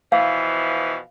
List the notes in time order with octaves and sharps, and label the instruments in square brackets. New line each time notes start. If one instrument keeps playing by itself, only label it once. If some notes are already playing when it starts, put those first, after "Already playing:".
[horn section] B2 E3 F3 [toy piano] F5